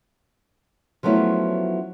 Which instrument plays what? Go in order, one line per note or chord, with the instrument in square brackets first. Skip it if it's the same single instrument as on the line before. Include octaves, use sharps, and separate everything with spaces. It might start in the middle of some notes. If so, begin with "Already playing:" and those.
[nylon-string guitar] F3 F#3 A3 B3 C#4 E4